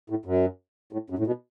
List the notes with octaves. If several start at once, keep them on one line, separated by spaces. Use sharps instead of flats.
A2
F#2
A2
F#2
A2
B2